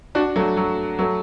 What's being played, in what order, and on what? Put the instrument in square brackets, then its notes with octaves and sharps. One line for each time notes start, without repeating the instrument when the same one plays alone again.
[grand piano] D4 F#4
F#3 A3
F#3
F#3 A3